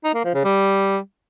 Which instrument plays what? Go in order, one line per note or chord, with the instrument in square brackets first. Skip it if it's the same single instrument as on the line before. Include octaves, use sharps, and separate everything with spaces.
[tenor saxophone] D#4
A#3
F3
C#3
G3